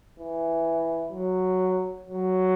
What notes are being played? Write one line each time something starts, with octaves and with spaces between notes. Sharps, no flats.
E3
F#3
F#3